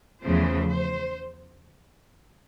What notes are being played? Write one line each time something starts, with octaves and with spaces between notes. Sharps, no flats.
E2 C#3 F3 A3 C5
C5